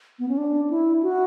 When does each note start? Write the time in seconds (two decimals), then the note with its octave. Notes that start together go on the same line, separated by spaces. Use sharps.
0.19 B3
0.29 C#4
0.38 D4
0.70 E4
1.03 F#4